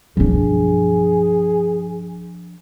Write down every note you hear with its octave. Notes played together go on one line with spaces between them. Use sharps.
B1 G2 F3 D4 G#4